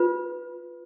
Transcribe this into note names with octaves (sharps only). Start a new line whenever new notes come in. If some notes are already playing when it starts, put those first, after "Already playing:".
Already playing: F4 B4